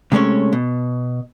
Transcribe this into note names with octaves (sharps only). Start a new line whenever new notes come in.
C3 G#3 A3 C#4 C#5
B2